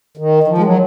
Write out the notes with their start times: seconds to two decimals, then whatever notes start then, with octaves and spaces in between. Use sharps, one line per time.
0.17 D#3
0.43 D#3
0.48 F3
0.58 G#3
0.63 F#3